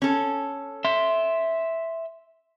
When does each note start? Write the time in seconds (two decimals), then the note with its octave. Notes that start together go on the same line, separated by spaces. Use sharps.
0.02 C#4 A4
0.85 E5 C6